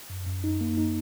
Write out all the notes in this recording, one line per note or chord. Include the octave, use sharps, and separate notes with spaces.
F#2
F#2
D#4
A#3
D#4